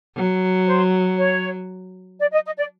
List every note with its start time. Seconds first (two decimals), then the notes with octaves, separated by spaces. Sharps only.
0.16 F#3
0.67 C5
1.18 C#5
2.20 D5
2.33 D#5
2.46 D#5
2.58 D5